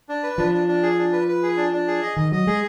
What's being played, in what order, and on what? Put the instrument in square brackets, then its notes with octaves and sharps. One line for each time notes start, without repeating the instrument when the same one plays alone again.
[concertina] D4
B4
[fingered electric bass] F3 [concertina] D4
[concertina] D4
D4
G#4
D4
B4
B4
G#4
D4
D4
G#4
D#5
[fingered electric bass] D#3 [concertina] D#5
[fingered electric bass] F#3 [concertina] D#5
[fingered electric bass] G#3 [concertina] G#4